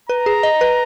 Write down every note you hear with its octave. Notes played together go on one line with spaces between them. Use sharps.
B4 A#5
G#4
D#5
B4